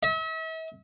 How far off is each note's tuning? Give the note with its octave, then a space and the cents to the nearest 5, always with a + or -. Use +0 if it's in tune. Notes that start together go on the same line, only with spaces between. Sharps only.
E5 -40